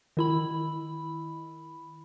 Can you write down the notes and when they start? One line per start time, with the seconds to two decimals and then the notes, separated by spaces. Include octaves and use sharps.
0.17 D#3 E4 B5